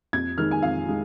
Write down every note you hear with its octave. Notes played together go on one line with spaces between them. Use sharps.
F2 G#6
D#3 G#3 D#4 F6
G#5
F2 F5
G#3 D#4